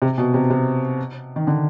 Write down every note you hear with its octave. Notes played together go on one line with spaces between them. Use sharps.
C3
B2
C3
C3
D#3
D3